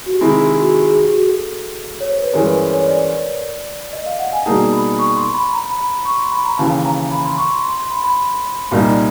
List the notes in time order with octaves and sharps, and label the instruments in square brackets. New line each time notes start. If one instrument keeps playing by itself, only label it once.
[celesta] F#4
G4
[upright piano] C3 D#3 G#3 C4 E4 [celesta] G#4
[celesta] G#4
G4
F#4
G4
G#4
G4
F#4
A4
C#5
C5
B4
[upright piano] G2 E3 G#3 C#4 [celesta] A#4
[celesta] B4
C5
C#5
D5
D#5
F5
F#5
G#5
[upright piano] B2 G3 A#3 D#4 G#4 [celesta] A5
[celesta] B5
C#6
C6
B5
A#5
B5
B5
C#6
C6
B5
A#5
[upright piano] D#2 C#3 E3 [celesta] A5
[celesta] A#5
B5
C6
C#6
C6
C6
C6
B5
B5
[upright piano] C2 A#2 G3 A#3 D#4